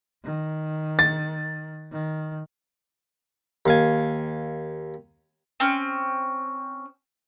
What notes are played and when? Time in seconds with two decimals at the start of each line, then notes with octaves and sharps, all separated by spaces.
0.24 D#3
0.99 A6
1.92 D#3
3.66 D#2 F5 G#5
5.60 C4 C#4